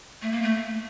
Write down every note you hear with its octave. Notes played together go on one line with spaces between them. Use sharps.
A3
A#3
A3